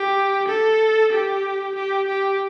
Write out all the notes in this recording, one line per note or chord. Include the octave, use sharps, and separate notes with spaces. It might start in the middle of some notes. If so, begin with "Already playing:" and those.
Already playing: G4
A4
G4
G4
G4